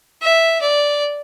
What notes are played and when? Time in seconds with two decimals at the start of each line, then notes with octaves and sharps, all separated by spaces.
0.23 E5
0.62 D5